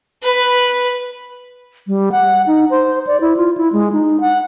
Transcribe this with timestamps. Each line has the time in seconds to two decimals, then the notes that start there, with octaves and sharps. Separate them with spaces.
0.23 B4
1.87 G3
2.12 F#5
2.47 D#4
2.70 C5
3.07 D5
3.21 E4
3.37 F4
3.57 E4
3.73 G#3
3.93 D#4
4.20 F#5